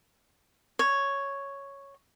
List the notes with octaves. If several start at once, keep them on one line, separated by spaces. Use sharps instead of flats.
C#5